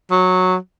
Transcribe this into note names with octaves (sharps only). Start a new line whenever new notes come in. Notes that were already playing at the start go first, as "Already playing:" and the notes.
F#3